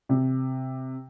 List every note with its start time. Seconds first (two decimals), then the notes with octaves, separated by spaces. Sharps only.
0.09 C3